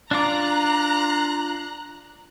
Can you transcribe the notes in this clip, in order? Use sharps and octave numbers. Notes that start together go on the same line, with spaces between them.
D4 F4 D5 A#5 F#6